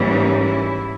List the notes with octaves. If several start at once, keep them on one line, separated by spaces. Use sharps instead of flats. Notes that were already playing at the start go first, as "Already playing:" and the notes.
Already playing: G#2 E3 G3 A#3 C#4
D#4
E4